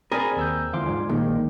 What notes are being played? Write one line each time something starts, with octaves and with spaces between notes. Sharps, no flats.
C4 G#4 A#4 D5 G#5 B5
D#2 E6 G6
E2 D3 F3 G#3 F5 C6 D6
G#2 F4 D5 G#5
A#1 D#2 D#3 G#3 A#3